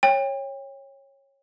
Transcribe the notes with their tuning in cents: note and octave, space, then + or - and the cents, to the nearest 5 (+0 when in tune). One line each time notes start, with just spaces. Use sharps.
C#5 -15 G5 +30